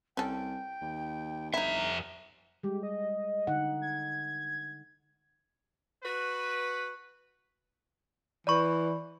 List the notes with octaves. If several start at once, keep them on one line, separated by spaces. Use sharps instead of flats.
C2 C#4 A4 G5
D#2
G1 F2 D#4 E4 E5 A#5
G3 G#3 G4
D#5
D3 D#4 F#5
G#6
F#4 B4
E3 D5 B5 C#6